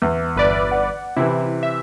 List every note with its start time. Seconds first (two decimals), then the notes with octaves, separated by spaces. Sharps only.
0.02 E2
0.36 G1 B4 D5
0.71 F#5
1.17 C3 E3 E4
1.63 E5